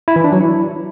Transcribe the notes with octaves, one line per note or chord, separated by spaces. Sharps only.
E4
E3
D4
F#3
E4